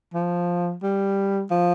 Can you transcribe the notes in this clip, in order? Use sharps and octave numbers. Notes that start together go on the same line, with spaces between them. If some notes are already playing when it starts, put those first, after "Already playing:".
F3
G3
F3